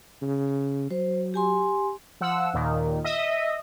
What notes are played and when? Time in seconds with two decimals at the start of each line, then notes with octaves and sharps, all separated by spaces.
0.22 C#3
0.91 F#3 C5
1.34 G4 G#5 C6
2.21 F3 F#5 E6
2.54 D#2 A#2 D#3
3.04 D#5 E5